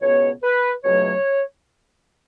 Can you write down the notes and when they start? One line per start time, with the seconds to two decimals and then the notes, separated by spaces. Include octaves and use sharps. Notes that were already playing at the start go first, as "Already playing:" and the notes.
0.01 C#2 B2 B3 C#5
0.42 B4
0.84 C#2 B2 F#3 A3 C#5